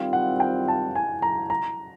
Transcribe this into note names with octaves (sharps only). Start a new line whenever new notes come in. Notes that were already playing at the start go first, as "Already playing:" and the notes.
Already playing: D#3 G3 C4 F4 F5
F#5
G5
A5
G#5
A#5
A#5